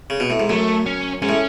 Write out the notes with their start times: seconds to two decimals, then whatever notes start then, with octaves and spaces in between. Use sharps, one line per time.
0.10 C#3
0.20 B2
0.30 A2
0.40 G#2
0.49 F#2 A3
0.86 C#4
1.22 G#2 C#4
1.29 A2